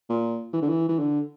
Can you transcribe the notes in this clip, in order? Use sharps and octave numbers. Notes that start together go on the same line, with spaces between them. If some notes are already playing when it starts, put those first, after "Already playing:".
A#2
E3
D3
E3
E3
D3